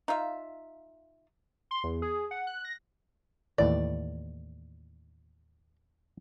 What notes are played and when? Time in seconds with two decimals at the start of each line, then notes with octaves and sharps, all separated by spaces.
0.08 D#4 F4 E5 F5
1.71 C6
1.84 E2
2.02 G#4
2.31 F#5
2.47 F#6
2.64 A#6
3.58 D#2 A2 E3 D5